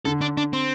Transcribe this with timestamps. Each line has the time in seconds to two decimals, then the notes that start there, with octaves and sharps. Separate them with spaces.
0.05 D3 A4
0.21 D4
0.37 D4
0.53 C4